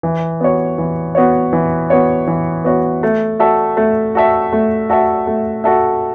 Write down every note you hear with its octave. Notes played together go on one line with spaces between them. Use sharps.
E3
B3 F#4 C#5
E3
B3 F#4 C#5
E3
B3 F#4 C#5
E3
B3 F#4 C#5
A3
F#4 A4 E5
A3
F#4 A4 E5
A3
F#4 A4 E5
A3
F#4 A4 E5